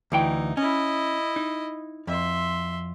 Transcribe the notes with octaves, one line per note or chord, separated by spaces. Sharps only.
D2 E3 D#4 G5
C#4 E4 D#5
D#4
F2 E5 C6